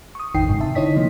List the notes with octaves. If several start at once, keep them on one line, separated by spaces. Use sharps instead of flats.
C#6 D#6
A1 F2 D#3 D#4 G5 C7
G1 G#2 C#3
C3 E5 A5
D3 D#4 E4 C#5 D#5 B6
C3 F3 A#3